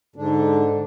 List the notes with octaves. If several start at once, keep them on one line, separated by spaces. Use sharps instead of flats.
G#2 D3 D4